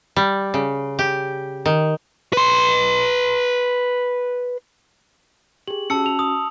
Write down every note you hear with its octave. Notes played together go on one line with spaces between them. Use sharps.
G3
C#3
G4
D#3
B4 C6
G4 G#4 F#7
C#4 F#4 A5 E6 C#7
F7
D#6